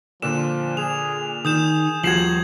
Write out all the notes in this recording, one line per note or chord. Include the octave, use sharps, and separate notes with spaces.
A#2 D3 F3 E7
G#4 F7
D#3 G#4 D#6 G6 E7
D#1 F3 F#4 G#6 C7 E7 F#7